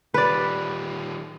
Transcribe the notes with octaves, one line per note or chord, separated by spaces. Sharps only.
D#3 G3 B4 D5